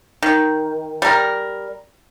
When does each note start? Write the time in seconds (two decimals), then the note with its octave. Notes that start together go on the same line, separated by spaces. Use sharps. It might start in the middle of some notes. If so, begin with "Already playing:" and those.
0.23 D#3
1.02 G3 A#4